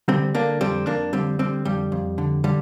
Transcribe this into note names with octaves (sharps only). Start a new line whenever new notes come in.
D3 G3 C4
D3 A#3 D4
F2 G3 C4
F2 A#3 D4
D3 G3 C4
D3 G3 C4
F2 G3
F2
D3
D3 G3